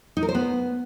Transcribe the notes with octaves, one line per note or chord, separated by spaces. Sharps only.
D#4
A#4
C5
B3